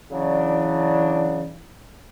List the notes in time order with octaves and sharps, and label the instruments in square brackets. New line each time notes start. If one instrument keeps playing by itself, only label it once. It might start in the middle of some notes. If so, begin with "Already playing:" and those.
[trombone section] C#3 F#3 D4 [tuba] E3